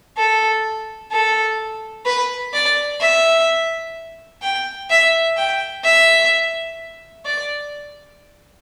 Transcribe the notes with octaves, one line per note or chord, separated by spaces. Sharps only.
A4
A4
B4
D5
E5
G5
E5
G5
E5
D5